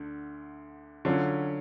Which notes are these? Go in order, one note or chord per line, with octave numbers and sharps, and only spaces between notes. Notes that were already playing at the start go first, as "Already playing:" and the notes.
Already playing: D2 D3
D3 F#3 C#4 F4